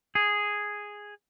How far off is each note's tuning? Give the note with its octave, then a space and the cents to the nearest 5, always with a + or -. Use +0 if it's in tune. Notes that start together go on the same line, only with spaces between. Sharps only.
G#4 -5